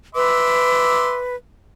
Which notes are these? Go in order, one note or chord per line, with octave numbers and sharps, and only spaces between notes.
B4 E5 C6 D6